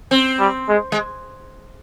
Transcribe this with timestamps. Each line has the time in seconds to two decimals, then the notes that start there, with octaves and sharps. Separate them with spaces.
0.11 C4
0.39 G3
0.69 G#3
0.92 G#3